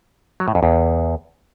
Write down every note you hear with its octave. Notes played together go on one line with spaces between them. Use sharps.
F#3
A2
F2
E2